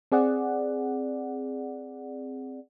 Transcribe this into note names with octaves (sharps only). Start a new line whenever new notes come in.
C4 G#4 D5 F#5